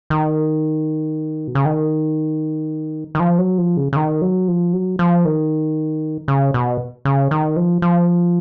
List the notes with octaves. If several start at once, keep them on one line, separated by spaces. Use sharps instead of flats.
D#3
B2
C#3
D#3
D#3
F3
F#3
F3
C#3
C#3
D#3
F#3
F3
F#3
F3
D#3
C#3
B2
C#3
D#3
F3
F3